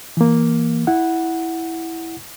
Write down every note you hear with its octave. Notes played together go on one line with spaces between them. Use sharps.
E3 A#3
E4 F#5